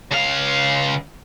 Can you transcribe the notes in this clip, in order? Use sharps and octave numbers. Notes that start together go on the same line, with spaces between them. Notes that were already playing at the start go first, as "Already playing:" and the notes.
C#2 F5